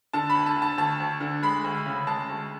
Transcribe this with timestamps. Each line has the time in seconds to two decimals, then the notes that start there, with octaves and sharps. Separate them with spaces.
0.13 D3 A5
0.30 B5
0.35 D2
0.46 A5
0.56 D3
0.62 A5
0.78 D2 A5
1.00 D2
1.21 D3
1.43 G#3 B5
1.64 D2
1.86 C#3
2.07 G#3 A5
2.29 D2